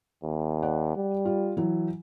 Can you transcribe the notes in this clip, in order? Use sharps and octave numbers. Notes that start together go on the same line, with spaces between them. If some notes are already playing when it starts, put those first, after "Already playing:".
D#2
D5 F#5
G3
F4
E3 F#3